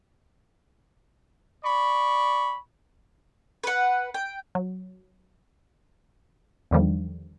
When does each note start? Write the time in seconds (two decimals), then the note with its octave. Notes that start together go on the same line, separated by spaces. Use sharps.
1.64 D5 B5 C#6
3.63 B4 F#5
4.14 G5
4.55 F#3
6.71 E2 D3 D#3 F3 G3